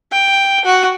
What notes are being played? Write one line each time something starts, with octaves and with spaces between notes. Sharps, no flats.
G5
F#4